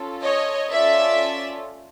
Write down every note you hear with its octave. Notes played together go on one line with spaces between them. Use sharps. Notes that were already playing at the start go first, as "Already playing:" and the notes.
Already playing: C#4 F4 A4
C#5 D#5
C#4 F4 A4 D5 E5